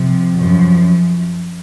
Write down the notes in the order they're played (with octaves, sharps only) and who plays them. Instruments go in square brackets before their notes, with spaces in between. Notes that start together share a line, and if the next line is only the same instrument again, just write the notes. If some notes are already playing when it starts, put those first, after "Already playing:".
Already playing: [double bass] C3 [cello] F3
[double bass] F#2 [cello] F3